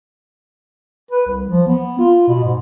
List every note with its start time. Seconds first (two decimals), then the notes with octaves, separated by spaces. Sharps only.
1.11 B4
1.26 C2
1.49 F3
1.67 B3
1.99 F4
2.28 B2
2.43 G#2